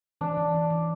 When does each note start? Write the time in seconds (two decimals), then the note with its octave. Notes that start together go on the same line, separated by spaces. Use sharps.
0.21 E3 D4
0.37 E3
0.54 E3
0.70 E3